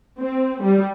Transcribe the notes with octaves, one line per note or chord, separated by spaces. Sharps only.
C4
G3